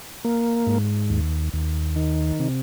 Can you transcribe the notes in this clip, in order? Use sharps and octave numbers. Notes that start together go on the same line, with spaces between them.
A#3
G#2
D#2
D#2
D#3
C3